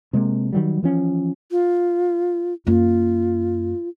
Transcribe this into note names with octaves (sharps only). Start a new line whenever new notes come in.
C3 G#3 A#3
D#3 F#3 G3
E3 F3 C#4
F4
F#2 A#3 F4